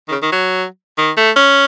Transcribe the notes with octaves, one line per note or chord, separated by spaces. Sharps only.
D#3
C#3
D#3
F#3
D#3
A3
C#4